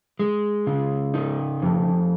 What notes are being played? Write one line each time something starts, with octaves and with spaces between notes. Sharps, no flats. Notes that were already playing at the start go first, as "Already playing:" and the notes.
G#3
C#3
D#4
F2